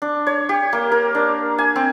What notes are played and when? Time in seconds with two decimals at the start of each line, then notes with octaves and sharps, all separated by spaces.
0.02 D4
0.27 C#5
0.49 G4
0.73 A#3
0.92 A#4
1.15 D4
1.58 G#5
1.76 C4